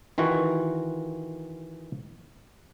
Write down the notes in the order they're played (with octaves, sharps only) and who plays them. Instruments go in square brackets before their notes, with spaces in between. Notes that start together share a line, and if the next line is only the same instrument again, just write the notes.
[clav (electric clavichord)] D#3 E3 F4 F#4